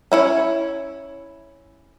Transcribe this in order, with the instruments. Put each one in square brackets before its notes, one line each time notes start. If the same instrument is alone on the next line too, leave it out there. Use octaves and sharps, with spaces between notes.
[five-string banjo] C#4 E4 C#5